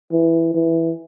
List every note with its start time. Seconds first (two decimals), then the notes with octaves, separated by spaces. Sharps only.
0.12 E3
0.55 E3